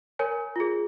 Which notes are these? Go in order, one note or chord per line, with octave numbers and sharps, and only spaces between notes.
A#4 C#5 G#5
F4 G#4